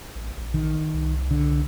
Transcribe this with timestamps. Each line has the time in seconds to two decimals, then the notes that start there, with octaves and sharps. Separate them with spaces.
0.15 A1
0.37 A#1
0.54 D#3
0.94 C2
1.31 D3